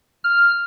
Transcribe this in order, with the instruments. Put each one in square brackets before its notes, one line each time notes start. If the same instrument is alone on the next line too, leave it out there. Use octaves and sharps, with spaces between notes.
[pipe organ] F6